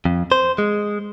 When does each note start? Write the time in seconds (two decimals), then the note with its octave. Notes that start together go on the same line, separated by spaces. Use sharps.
0.05 F2
0.32 C5
0.58 G#3